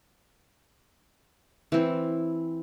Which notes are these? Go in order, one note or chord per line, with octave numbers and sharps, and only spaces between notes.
E3 C4